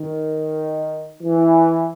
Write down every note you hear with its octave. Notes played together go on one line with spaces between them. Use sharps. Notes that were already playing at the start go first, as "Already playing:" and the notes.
Already playing: D#3
E3